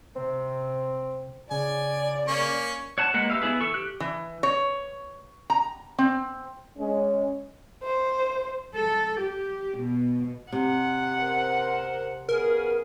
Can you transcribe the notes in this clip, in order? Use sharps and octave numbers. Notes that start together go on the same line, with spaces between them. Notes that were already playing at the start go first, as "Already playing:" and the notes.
C3 C4
C#3 D5 G#5
A#3 C#4 C#6
C#5 F#5 A5
G#3 A#3 B4 F#5
G4 B4 E5 F5
B3 E4 G#4 B4
E3 A4 C#6
G4 F#6
E3
C#5
A#5
C4
G#3 C#4
C5
A4
G4
B2
C3 F#5
A#4 C5
C#3 B3 G#4 A#4